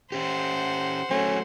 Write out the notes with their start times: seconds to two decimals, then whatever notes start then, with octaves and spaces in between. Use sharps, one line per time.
0.12 C#4 G4 C5 F#5
1.11 F#3 A3 C#4